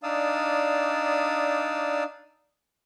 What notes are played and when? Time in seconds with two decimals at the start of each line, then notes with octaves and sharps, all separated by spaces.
0.03 D4 D#4 D5 F5 D#6 E6